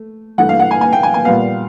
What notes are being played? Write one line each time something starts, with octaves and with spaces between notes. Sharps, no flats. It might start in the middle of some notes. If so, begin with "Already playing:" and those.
Already playing: A3
G2 E3 A3 F#5
F5
F#5
G#5
G#5
G5
G#5
G#5
A#2 G3 B3 F5